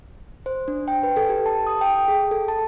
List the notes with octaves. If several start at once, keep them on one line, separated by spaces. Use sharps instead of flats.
C5
D4
G5
B4
A4
G4
A5
D#6
G5
G#4
A4
A5